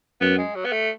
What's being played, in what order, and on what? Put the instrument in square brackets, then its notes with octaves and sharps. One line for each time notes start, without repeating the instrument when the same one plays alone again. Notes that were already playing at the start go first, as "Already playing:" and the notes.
[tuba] F#2 [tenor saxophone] B3
[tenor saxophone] G#3
F#3
B3
A3